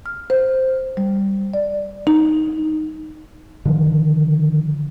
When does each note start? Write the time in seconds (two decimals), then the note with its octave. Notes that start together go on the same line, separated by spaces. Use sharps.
0.06 F6
0.30 C5
0.97 G3
1.54 D5
2.07 D#4
3.65 D3 D#3 F3